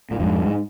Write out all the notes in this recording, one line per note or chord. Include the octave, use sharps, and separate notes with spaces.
A#2
F2 G#2
G#2